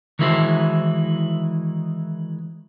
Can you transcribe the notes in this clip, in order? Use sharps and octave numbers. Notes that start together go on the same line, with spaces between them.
D#3 E3 G#3 E4 F#4 C5